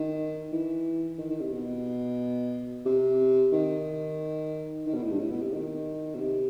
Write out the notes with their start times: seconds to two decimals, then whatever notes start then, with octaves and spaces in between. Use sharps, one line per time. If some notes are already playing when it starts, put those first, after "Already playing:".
Already playing: D#3
0.52 E3
1.18 D#3
1.30 D#3
1.41 C3
1.52 B2
2.85 C3
3.53 D#3
4.86 D#3
4.94 B2
5.03 A2
5.11 G2
5.20 A2
5.31 B2
5.42 C3
5.53 D#3
6.15 B2
6.20 C3